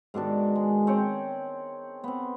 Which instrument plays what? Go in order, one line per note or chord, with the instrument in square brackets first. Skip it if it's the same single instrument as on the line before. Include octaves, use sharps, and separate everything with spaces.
[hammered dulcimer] G#2 B2 D#3 D4
G#3
C4 C#5 G5
B3 C4